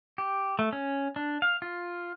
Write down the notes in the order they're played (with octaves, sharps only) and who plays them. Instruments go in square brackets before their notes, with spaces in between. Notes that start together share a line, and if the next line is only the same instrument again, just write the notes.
[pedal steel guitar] G4
A3
C#4
D4
F5
F4